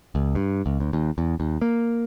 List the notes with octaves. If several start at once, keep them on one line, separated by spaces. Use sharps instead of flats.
C#2
G2
C#2
D2
D#2
E2
D#2
A#3